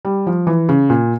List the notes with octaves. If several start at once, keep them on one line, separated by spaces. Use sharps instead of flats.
G3
F3
E3
C#3
A#2